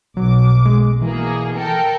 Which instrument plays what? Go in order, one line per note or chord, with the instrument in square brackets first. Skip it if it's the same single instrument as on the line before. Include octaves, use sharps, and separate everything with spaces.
[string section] B1 D6 [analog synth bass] F#3
[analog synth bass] G#3
[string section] B2 A#3 G#4 [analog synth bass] E3
[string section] A4 A#4 G5